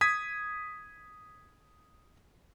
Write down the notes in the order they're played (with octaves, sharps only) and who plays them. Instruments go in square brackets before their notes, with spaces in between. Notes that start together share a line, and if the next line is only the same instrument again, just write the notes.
[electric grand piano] D#6 G#6 B6